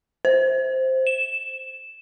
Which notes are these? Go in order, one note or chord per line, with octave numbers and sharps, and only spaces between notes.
C5
E7